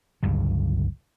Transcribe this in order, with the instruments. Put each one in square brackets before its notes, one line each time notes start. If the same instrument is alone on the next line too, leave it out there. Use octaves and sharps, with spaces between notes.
[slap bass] G1 C#2 G2 F#3